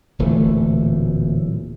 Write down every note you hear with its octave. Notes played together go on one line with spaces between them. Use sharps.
D1 A#2 E3 A3